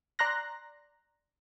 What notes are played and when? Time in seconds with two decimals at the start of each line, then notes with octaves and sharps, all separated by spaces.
0.19 D5 A#5 C6 F#6 A#6